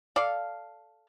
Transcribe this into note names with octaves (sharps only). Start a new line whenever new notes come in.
A4 D5 F5